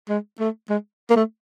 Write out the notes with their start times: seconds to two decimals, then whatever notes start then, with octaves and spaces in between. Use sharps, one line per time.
0.09 G#3
0.40 A3
0.70 G#3
1.10 A#3
1.16 A3